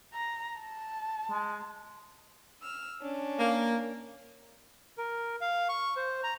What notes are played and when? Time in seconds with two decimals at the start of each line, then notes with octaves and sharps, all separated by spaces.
0.14 A#5
0.60 A5
1.31 G#3
2.61 E6 F6
3.01 C#4 D4
3.39 A#3
4.98 A#4
5.41 F5
5.69 C#6
5.97 C5
6.24 A#5